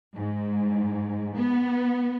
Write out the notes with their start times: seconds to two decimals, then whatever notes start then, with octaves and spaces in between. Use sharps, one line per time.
0.16 G#2
1.37 B3